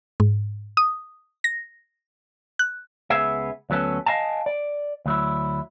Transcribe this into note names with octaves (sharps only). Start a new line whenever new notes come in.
G#2
D#6
A#6
F#6
C#2 B3 G#4 E5
D2 F#3 B3 C#4 A4
D#5 F5 G#5 A5
D5
D2 F#3 E4